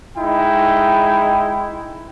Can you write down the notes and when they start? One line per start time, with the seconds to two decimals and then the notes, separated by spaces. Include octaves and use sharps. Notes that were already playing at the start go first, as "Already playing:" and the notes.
0.17 G#3 D#4 E4 G5